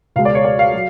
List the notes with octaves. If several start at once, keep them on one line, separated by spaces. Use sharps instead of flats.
C#2 B2 G#3 F5
D5
C#5
D5
F5
F#3